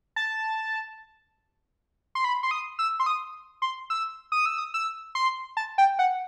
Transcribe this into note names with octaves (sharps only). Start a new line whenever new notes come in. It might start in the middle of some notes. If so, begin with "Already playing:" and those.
A5
C6
B5
C6
D#6
E6
C6
D#6
C6
E6
D#6
E6
D#6
E6
C6
A5
G5
F#5